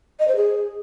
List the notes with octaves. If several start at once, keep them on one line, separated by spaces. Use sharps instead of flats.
D#5
C5
G#4